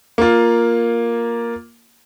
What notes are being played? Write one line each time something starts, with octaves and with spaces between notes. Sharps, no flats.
A#3 F4